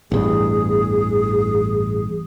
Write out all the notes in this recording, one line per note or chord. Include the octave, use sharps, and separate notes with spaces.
A1 E2 G2 G#4